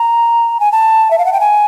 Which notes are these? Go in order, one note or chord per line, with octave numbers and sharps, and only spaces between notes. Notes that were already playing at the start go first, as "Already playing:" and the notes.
Already playing: A#5
G#5
A5
E5
F5
F#5
G5
G#5